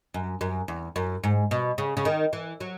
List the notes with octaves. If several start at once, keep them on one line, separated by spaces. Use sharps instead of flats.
F#2
F#2
E2
F#2
G#2
B2
C#3
C#3
D#3
E3
F#3